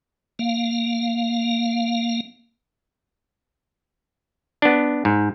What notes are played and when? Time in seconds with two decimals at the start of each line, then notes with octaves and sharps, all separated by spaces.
0.39 A#3 F5
4.62 B3 D4
5.05 G#2